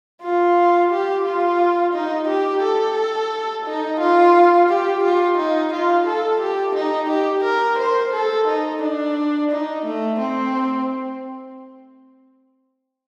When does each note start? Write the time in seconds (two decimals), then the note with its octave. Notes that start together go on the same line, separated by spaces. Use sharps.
0.22 F4
0.91 G4
1.25 F4
1.94 D#4
2.28 G4
2.63 A4
3.66 D#4
4.00 F4
4.69 G4
5.04 F4
5.38 D#4
5.73 F4
6.07 A4
6.41 G4
6.75 D#4
7.10 G4
7.44 A#4
7.79 C5
8.13 A4
8.48 D#4
8.82 D4
9.51 D#4
9.86 A3
10.20 C4